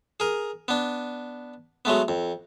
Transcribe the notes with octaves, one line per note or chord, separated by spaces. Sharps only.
G#4 A#4
B3 D4
F#3 G#3 A3 B3
F2